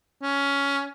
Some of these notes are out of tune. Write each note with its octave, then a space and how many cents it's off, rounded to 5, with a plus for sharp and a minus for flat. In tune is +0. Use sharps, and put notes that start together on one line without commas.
C#4 +15